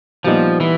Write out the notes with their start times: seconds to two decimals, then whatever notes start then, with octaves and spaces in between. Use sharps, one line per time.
0.25 A#2 F3 G3 B3 D#4
0.60 E3